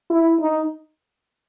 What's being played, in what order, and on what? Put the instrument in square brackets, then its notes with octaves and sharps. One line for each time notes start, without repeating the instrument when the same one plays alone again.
[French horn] E4
D#4